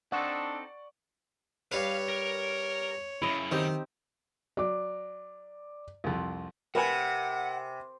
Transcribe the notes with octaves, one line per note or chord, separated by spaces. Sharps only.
C4 D4 D#4 A4 D5 F#5 C#6
G2 B4 C#5 F5
A#4
F#2 C#3 E4 D#5
D#3 C4 D#4 G4
F#3 D5 D6
C2 F2
C3 A#4 B4 F#5 G#5